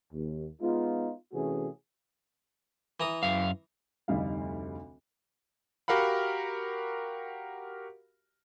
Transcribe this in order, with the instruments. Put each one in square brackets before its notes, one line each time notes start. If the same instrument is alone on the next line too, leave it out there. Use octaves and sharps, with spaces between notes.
[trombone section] D#2
G#3 B3 D#4 F4
C3 E3 A3 C#4 F#4 G#4
[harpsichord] E3 A#5 D#6
[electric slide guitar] F#2 F5
[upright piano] F1 D2 G3 D#4 F5
[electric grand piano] F#4 G4 A#4 F5 F#5 B5